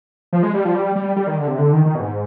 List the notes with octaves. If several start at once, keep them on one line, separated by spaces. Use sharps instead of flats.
F3
G#3
G3
F3
G3
G3
G3
D#3
D3
C3
D3
D#3
D#3
B2
G#2